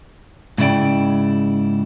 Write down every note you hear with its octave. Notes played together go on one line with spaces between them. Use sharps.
G#2 C#3 E4 D5 G5